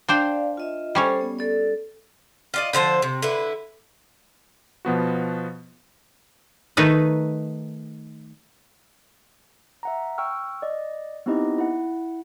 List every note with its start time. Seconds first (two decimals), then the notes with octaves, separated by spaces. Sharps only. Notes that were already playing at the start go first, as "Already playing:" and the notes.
0.09 D4 C5 D5 F5 G5
0.57 F4 D#5 E5
0.95 G3 C#4 A4 C5 C#5
1.21 B3
1.39 A4 D5
2.54 F4 D5 D#5
2.73 D3 F3 C5 A5
3.02 C3
3.22 D3 E4 B4
4.85 B2 F3 B3 F#4
6.77 D#3 A3 D#4 B4
9.83 E5 F#5 A#5
10.18 G5 C#6 E6 F6
10.62 D5 D#5
11.26 B3 C4 D#4 E4 G4 D#5
11.58 E4 F#5